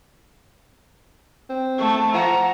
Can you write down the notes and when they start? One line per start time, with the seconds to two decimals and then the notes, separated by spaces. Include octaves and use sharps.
1.50 C4
1.79 A3 A5 C#6
2.14 F3 F#5 A#5